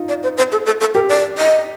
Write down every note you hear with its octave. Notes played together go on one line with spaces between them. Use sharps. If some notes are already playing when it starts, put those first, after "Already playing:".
Already playing: D#4 F4
D5
C5
C5
A4
A4
A4
G4 A#4
D5
D#5